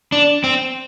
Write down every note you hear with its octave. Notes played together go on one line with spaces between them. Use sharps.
D4
C4